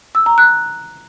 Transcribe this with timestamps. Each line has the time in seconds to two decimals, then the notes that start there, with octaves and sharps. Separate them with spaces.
0.15 E6
0.26 A#5
0.38 F#6